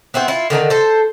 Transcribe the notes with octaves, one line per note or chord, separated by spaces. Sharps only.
B3 C4 E4 C5
E4 F4
D3 D#3 C#4 D#4
A4 C5